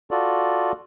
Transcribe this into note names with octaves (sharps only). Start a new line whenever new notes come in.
F4 F#4 A4 D5